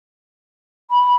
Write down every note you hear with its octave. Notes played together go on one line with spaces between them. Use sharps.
B5